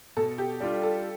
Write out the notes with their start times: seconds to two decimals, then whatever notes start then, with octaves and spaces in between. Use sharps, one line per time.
0.17 B2 A4
0.38 G4
0.60 G3 D4 F4
0.83 A4